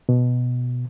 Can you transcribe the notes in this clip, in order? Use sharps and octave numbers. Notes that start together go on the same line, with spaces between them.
B2